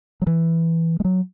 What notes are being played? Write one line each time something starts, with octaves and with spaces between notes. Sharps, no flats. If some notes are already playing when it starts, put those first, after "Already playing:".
F#3
E3
G#3
F#3